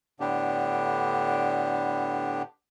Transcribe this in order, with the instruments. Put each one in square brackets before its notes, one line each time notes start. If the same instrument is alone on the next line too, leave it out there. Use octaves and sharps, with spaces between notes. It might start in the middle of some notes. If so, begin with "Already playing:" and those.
[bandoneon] A2 D3 B3 D4 G4